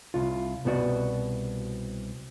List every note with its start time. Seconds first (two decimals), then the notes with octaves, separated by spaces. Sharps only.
0.14 C2 F4
0.65 C2 B2 B3 F#4 D5